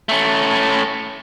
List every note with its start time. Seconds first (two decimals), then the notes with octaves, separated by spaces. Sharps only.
0.09 A3 C#4